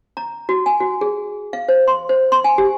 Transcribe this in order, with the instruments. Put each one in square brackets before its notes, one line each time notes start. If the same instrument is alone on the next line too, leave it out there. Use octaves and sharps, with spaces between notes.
[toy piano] A#5
F#4
G#5
F#4
G#4
F5
C5
C6
C5
C6
G#5
G4